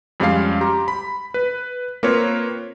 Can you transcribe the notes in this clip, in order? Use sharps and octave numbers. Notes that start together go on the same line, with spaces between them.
F2 G3 G#3 C#4 F5 C7
G4 A#5 C6
B5
B4
A#3 C4 F4 A#4 B4 C#5